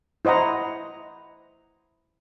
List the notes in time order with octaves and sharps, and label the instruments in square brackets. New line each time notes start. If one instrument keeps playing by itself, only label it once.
[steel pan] E4 C5 D#5 F#5 A#5